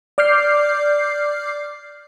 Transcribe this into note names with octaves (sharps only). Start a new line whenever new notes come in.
D5 D6 F6 G6 C7